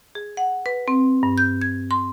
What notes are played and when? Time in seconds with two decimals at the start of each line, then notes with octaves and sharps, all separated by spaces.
0.15 G#4
0.37 F#5
0.66 B4
0.88 C4
1.23 G2
1.38 G6
1.62 G#6
1.91 C6